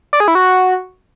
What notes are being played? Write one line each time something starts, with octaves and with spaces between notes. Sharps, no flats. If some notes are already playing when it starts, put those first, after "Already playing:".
D5
G#4
E4
F#4